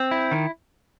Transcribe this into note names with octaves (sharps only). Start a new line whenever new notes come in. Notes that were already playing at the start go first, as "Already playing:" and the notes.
Already playing: C4
E4
D#3